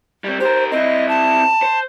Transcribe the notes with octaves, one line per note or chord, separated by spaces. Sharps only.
G3 C4
G4 A#4 C5
C4 E4 D#5
A5
C5